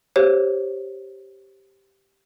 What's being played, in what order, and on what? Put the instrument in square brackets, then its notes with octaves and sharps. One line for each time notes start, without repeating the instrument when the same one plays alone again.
[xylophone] G4 C5 C#5